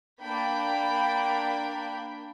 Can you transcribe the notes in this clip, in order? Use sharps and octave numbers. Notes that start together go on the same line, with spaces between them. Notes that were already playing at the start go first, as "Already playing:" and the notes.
A#3 D4 G5 B5